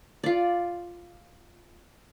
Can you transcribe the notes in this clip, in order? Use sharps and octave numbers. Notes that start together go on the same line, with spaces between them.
F4 D5